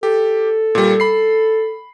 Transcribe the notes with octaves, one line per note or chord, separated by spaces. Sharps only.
G4 A4
A#2 G3
B5 C7